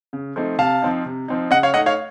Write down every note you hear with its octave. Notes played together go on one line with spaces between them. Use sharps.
C#3
F3 A3 C4 D#4
C3 F5 A5
F3 C4 D#4
C3
F3 C4 D#4
C#3 D#5 F#5
C#5 F5
A3 D#4 D#5 F#5
C#5 F5